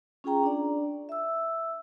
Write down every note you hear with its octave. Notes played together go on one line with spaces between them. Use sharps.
C#4 F4 G#4 G5 A#5
D4 D5
E5 E6